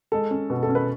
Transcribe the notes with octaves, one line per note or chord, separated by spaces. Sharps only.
G#3 A4
C#4
B2
A4
C#4
B4